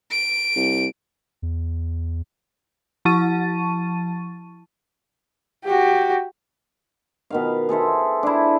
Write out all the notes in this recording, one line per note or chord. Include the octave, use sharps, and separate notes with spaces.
D7
C2
E2
F3 E4 A5 C#6 A6 D#7
F#4 G4
B2 D#3 F5
G#4 A4 C5 E5
D4 E4